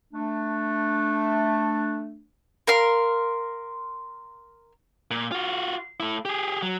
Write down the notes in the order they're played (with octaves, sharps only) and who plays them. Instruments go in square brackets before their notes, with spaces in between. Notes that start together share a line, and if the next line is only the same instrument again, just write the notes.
[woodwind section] A3 D4
[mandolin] A#4 F5 C6
[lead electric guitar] A#2
F4 F#4
A3 E4
G4 G#4
F#3